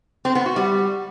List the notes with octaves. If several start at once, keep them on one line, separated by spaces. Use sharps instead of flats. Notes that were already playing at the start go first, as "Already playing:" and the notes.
C4
B3
F#4
G3